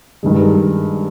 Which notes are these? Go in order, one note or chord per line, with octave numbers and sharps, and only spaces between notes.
G2 D#3 G#3